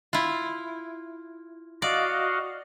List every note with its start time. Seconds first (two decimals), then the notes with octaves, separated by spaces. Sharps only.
0.13 E4 F4
1.82 F#4 D5 D#5 F5